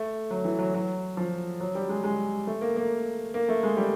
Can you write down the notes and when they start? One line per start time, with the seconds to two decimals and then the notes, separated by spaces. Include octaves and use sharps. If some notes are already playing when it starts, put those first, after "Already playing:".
Already playing: A3
0.31 F#3
0.45 E3
0.59 F#3
0.74 F#3
1.17 F3
1.60 F#3
1.75 G3
1.89 G#3
2.03 G#3
2.47 A3
2.61 A#3
2.76 A#3
3.34 A#3
3.49 A3
3.63 G#3
3.77 G3